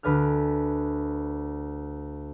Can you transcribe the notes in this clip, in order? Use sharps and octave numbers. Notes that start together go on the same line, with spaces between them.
D2 B4 D5 G#5 F6